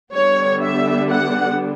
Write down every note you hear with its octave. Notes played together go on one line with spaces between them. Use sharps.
D3 G3 B3 D4 C#5
E5
F#5